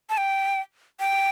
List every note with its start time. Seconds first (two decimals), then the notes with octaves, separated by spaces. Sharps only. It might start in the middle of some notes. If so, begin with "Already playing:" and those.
0.10 A5
0.17 G5
1.00 G5